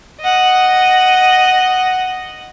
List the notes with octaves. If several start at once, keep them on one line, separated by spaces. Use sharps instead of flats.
D#5 F#5